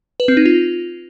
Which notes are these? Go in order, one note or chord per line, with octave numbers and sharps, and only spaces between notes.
B4
C4
D#4
F4